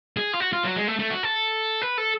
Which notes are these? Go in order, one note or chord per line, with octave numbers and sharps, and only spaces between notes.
G#4
F4
F#4
F4
F#3
G#3
A3
A3
F#4
A4
B4
A4